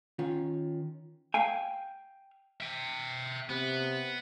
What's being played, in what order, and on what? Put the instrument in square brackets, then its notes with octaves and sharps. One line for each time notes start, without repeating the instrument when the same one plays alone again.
[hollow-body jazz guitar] D#3 C#4 F4
F5 G5 G#5
[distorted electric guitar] E5 G5
[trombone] C3 [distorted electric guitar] B3